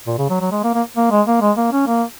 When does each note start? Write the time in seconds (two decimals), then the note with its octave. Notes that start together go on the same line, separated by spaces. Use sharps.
0.07 A#2
0.19 C#3
0.30 F#3
0.41 F#3
0.51 G#3
0.64 A#3
0.74 A#3
0.97 A#3
1.11 G#3
1.28 A#3
1.41 G#3
1.57 A#3
1.72 C#4
1.87 A#3